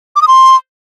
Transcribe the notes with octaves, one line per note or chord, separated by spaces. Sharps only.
D6
D#6
C6